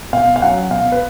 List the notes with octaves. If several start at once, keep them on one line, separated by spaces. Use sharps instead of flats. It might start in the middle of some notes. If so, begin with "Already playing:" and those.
B2 F5
F5
F#3 C#4 F#5
B2 F5
B4